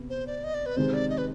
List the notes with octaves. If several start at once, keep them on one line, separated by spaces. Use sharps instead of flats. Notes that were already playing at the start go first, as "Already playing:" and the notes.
Already playing: C3 B3
C5
D5
D#5
D5
B4
C3 D#3 G#3 C5
D5
D#5
B4